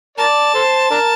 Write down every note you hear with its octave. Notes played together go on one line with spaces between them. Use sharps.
A#4 D5 A5
A4 C5
D4 A#4